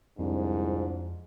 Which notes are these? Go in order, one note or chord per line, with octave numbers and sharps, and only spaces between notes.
C2 F2 G#2 F3 D4